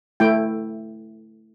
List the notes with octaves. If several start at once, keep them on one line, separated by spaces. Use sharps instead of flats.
A3 E4 G5